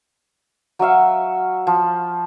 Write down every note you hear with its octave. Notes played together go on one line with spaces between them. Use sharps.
F#3 F#4 E5 F5
F3